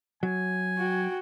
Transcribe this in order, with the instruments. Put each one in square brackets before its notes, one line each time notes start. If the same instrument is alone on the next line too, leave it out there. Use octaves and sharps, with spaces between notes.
[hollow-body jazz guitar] F#3 [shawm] G#5
[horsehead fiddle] F#4 G5